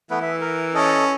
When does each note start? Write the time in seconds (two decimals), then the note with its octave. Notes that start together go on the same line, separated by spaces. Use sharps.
0.10 E3 A3 B3 B4
0.22 E5
0.41 A#4
0.75 C#4 A4 D#5